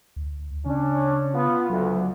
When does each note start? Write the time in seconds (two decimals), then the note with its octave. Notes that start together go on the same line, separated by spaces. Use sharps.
0.16 D2
0.66 C#3 C#4 D4
1.35 B3 F4
1.70 D2 F#3